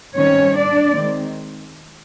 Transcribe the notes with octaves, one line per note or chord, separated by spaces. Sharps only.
D#3 G3 C4 C#4 C#5
D4 D5
D#3 G#3 C4